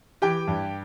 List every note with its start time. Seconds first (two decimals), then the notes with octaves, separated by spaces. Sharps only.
0.22 E3 G4 G5
0.48 G2